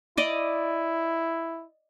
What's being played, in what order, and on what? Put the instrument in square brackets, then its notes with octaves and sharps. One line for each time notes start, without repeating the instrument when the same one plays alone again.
[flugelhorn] E4 [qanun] D5 D#5